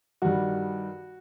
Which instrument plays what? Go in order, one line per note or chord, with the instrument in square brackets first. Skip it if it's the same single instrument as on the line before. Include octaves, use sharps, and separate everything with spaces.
[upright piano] G2 D#3 G3 F#4